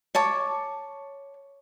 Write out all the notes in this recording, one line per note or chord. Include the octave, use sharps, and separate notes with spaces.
C#5 A5 D6